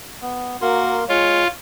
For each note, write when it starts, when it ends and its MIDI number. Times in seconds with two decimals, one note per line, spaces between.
0.22 0.57 59
0.62 1.04 58
0.62 0.98 66
0.62 1.04 70
0.62 1.04 84
1.09 1.44 56
1.09 1.48 65
1.09 1.49 73